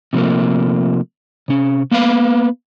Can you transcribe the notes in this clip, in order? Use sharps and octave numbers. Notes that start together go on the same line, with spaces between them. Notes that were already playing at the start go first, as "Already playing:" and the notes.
C3 F3 A3 A#3
C3 C#4
A#3 B3 B4 F5